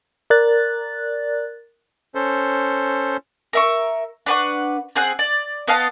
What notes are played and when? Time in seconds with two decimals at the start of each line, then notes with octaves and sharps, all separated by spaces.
0.30 A#4 D5 F#6 A6
2.15 C#4 A4 C5
3.53 A#4 E5 C#6
4.26 D4 B4 F#5 C#6
4.96 C4 G#4 F#5 F#6
5.19 D5
5.68 B3 D#5 F5 A5